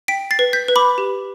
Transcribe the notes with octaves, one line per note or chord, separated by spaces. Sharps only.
G5 B6 D7
A6 C7
B4
G6 B6
B4
B5 D6
G4